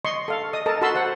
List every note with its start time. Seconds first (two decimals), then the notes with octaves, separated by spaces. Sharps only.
0.05 D#5 C6 C#6
0.28 A4 F5
0.53 D#5 D#6
0.66 A4 A#4 D#5 A5
0.81 F#4 A4 A5 B5 C6 E6
0.95 C5 F#5